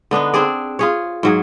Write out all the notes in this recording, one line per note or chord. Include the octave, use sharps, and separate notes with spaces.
D3 B3 D4 D#4
C4 D4 G#4 D5
F4 G#4 C#5
G#2 F#3 G#4